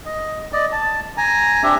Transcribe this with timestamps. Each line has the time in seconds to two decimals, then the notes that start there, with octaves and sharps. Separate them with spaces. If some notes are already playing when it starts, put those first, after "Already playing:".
0.06 D#5
0.53 D5 D#5
0.72 A5
1.17 G#5 A#5
1.63 C4 D4 G4 E5